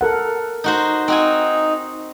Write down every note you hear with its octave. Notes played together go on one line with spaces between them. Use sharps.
A4 A#4 F#5
D#4 F#4 C5
C4 D#4 F#4 G#5